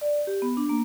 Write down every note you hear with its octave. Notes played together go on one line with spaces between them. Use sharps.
D5
G4
B3
D4
A#3